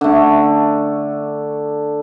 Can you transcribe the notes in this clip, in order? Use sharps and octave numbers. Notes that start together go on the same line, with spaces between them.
D3 A3